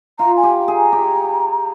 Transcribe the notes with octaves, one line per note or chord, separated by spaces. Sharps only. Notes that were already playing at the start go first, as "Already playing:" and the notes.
F4 A#5
G#5
G4
G#4
A#5
G4